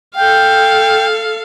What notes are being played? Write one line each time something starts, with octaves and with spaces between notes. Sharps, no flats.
A4 F5 G5